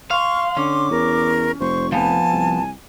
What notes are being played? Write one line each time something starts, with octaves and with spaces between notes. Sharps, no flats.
F5 C6 C#6
D3 C#4 D6
E2 A#4
F1 C5 C#6
F3 B3 G#5 A5
C2